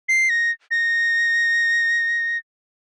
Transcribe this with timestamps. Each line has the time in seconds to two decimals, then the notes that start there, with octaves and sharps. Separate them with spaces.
0.09 C7
0.29 A#6
0.71 A#6